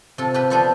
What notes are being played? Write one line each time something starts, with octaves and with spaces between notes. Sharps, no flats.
C3 F4 A4
G4 B4
F3 B3 D4 A4 C5